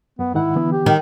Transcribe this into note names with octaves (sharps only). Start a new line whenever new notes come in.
F#2 B3
G#2 D#3 E4 F#5
D3 E3 B3
G4
D#3